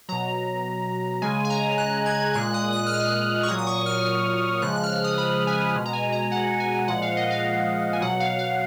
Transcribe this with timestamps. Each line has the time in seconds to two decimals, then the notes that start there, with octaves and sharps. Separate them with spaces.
0.09 B2 F#3 A#5
1.22 C#3 G#3 G#5
1.45 G#5
1.50 A#5
1.78 F#6
2.06 G#6
2.34 A#2 G#3 F#6
2.54 D#6
2.73 F#6
2.86 F6
2.91 F#6
3.43 C#6
3.48 A#2 F#3 D#6
3.58 D#6
3.67 C#6
3.86 F6
4.62 C#3 F3 G#3 F#6
4.76 F#6
4.83 F6
4.90 F#6
5.04 D#6
5.18 B5
5.47 G#5
5.75 B2 G#3
5.85 A#5
5.93 G#5
6.12 A#5
6.31 F#5
6.60 G#5
6.87 A#2 F3 G#3 F#5
7.02 F5
7.17 D#5
7.31 F5
7.93 G#5
8.01 B2 F#3 F#5
8.20 F5
8.39 F5